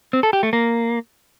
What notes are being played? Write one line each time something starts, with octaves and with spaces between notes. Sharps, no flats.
C4
A4
G4
A3
A#3